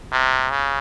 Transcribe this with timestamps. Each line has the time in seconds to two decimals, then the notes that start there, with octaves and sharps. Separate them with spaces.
0.12 C3
0.50 C#3